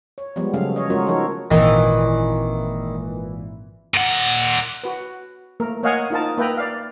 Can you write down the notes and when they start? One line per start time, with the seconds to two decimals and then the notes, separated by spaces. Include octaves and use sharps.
0.18 C#5
0.36 F3 G3 G#3 B3
0.54 C#3 F#3 G#3 A3 C#4 F5
0.76 C#5 D#5
0.90 G#3 A3 C#4 F4 F#4 A#4
1.07 F3 D#4 A4 A#4 C#5
1.51 G#1 A#2 D#3 E3
3.94 A#2 F#5
4.84 F#4 B4
5.60 A3 A#3 A#4
5.83 A#3 C#5 D#5 F5 F#5 G#5
6.10 D#4 F4 A#4 A5
6.37 A#3 B4 E5 G5 A#5
6.58 D5 F5